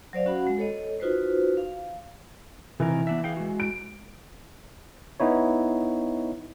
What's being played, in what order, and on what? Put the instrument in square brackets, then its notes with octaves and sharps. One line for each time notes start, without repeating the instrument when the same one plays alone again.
[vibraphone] F#3 C5 D5 F5
C#4 F#4 F5 F#5 B5
G#3
A4 C#5 D#5
D#4 F4 F#4 B4 C5
F5
[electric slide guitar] C3 D#3 A#4 [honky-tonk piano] E3
[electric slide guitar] B3 D4 E5
G#4 F5 G5
G#3 F#4
[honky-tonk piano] D7
[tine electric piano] B3 D#4 E4 C#5